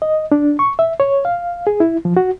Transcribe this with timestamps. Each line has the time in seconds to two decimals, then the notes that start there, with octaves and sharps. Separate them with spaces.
0.02 D#5
0.32 D4
0.59 C#6
0.79 E5
1.00 C#5
1.25 F5
1.67 G#4
1.80 E4
2.05 F3
2.17 F#4